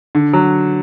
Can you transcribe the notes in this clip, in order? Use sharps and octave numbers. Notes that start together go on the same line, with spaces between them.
D3
F#3